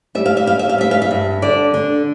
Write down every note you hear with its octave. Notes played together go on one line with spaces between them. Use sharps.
G3 E5
F5
E5
G3 F5
E5
F5
G3 E5
F5
E5
G2
D3 D5
D3